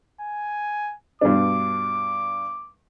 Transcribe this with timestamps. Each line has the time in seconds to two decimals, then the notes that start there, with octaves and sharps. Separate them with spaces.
0.21 G#5
1.21 G2 B2 D4 D6